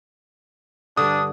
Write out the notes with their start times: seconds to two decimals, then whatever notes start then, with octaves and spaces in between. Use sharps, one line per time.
0.97 G2 D3 D4 D#6